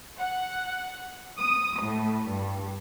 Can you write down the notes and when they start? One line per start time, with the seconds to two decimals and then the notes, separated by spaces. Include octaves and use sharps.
0.17 F#5
1.37 D#6
1.81 A2
2.28 G2